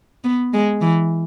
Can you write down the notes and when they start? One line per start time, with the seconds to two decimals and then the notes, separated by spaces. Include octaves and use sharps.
0.24 B3
0.53 G#3
0.81 E3